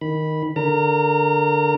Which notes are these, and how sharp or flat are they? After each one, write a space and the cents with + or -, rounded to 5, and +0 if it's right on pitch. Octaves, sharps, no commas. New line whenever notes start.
D#3 +0 B5 -10
D3 +0 A#4 +0 A#5 -35